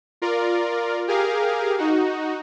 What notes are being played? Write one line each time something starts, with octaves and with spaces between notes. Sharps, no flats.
F4 A#4 D5
G4 G#4 A#4 F5
D#4 F#4